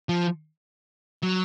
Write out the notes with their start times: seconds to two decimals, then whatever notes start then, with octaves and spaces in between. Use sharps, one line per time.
0.09 F3
1.23 F#3